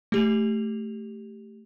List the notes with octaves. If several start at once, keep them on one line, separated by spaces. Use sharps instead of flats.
A3 G4 F7